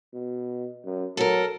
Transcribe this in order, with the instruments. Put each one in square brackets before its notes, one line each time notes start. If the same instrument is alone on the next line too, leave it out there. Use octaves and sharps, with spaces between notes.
[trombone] B2
F#2
[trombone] F#3 [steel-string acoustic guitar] A4 A#4